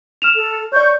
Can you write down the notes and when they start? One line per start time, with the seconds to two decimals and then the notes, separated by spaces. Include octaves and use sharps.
0.22 F6 E7 F7
0.34 A4
0.72 C#5 D5 C#6 G6